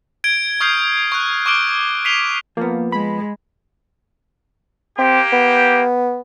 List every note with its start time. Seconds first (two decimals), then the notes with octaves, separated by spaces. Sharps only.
0.24 G#6 D7 G7
0.60 C#6 D#6 F6 G6 G#6 C7
1.12 C#6 F#6
1.46 C#6 D6 F6 D7 G7
2.05 B6 C7 D#7 F7 G7
2.57 F3 A#3 B3
2.92 G#3 B5
4.99 A#3 C4 G4
5.33 B3